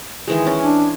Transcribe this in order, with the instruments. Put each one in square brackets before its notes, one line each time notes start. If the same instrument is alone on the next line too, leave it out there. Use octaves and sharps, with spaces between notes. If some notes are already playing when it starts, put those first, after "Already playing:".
[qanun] D#3 E3 G#3
C#4
[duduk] D4